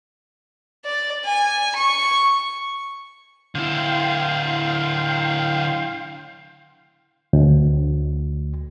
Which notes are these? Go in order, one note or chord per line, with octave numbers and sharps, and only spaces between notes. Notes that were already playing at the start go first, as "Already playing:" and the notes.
D5
G#5
C#6
D3 E4 F5 G5 C6
D2